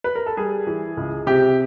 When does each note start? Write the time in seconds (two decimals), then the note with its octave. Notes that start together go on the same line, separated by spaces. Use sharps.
0.04 B4
0.15 A#4
0.26 A4
0.37 G3 G#4
0.67 E3
0.97 C#2
1.27 C3 G4